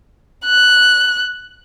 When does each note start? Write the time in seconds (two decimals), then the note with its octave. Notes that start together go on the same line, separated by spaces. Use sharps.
0.45 F#6